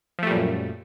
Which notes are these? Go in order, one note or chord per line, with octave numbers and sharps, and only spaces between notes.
F#2 A#2 F3 G3 A3